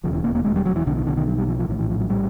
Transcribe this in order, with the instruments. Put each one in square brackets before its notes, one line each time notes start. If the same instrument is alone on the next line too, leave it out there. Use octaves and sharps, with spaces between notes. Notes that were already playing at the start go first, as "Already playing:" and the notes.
[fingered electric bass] E1 D#2 C#3 F3
E3
A#3
A#3
G#3
G3
F#3
E3
B1 B2 D3
D#3
D3
D#3
F#3
G3
F3
F3
A#1 A2 D#3
E3
F3
F#3
G3